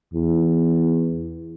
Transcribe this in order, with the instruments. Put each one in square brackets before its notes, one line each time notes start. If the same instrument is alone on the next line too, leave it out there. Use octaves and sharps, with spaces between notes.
[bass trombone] E2